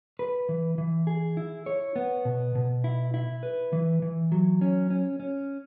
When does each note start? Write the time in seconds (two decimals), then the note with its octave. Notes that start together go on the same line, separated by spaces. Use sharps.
0.19 B4
0.49 E3
0.78 E3
1.07 G#4
1.37 E4
1.66 C#5
1.96 B3
2.25 B2
2.55 B2
2.84 E4
3.14 E4
3.43 B4
3.73 E3
4.02 E3
4.32 F#3
4.61 C#4
4.90 C#4
5.20 C#4